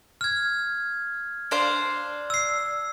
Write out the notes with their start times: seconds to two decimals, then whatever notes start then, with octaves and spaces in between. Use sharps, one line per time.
0.21 F6 G#6
1.51 D4 C5 F5
2.30 E6 C7